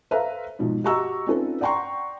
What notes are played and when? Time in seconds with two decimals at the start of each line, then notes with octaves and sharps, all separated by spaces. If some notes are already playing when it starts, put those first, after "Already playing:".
0.11 A4 B4 C5 E5 F5 A#5
0.59 G#2 B2 F3
0.84 F#4 G4 D#5 A#5 C#6 E6
1.27 C4 C#4 D#4 F4 A4 B4
1.61 D5 F#5 G5 A#5 C6 C#6